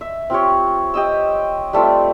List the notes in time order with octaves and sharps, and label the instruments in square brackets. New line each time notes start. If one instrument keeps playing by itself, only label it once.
[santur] E5
C4 F4 G4 C#5
G4 D#5 E6
G3 A3 C4 F4